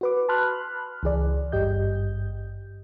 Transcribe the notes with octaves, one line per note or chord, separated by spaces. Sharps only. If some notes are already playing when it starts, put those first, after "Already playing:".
F#4 B4 D6
A5 B5 C6 F6 F#6
C#2 E3 G#4 D5
G#1 G2 G4 D#5 G6